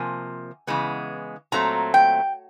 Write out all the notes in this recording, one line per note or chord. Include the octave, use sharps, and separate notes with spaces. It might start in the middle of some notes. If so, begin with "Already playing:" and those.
Already playing: C3 F3 A#3 G#5
C#3 E3 G#3 B3
A#2 F#3 A3 C4 A#5
G5